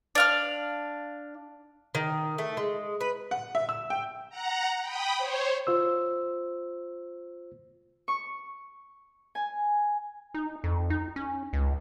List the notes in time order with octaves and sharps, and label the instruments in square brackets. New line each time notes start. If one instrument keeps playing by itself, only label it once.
[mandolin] D4 F5 F6
[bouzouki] D#3
A3
G#3
B4
[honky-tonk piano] F#5
E5
E6
G5
[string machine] F#5 A#5
G5 B5 D#6
C5 C#5
[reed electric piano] F4 C5 E6
[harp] C#6
G#5
[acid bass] D#4
F2
D#4
C#4
C#2